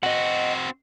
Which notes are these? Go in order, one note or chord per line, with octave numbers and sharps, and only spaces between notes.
C4 F#4 D#5 F#5